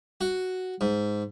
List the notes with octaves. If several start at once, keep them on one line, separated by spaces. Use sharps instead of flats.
F#4
G#2